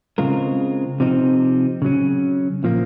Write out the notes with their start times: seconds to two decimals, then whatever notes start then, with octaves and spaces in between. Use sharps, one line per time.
0.18 C#3 G#3 C4 F4 A#4
1.00 C3 F3 C4 D#4
1.82 C#3 F#3 C#4
2.64 A#2 F3 A#3